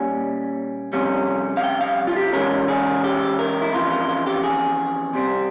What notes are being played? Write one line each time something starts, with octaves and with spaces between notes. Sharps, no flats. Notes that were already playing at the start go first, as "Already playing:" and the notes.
Already playing: A#2 G3 A#3 C#4 G#5
F2 C3 G3 C#4
F5
G5
F5
F4
G4
C#3 E3 G#3 C#4 A#4
G#4
G4
A#4
E4
F2 C#3 E3 F4
F4
F4
G4
G#4
C3 G3 C4